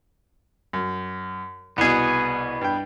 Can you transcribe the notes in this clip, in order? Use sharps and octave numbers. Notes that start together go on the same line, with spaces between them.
F#2
C2 B2 B3 G#4
G2 G5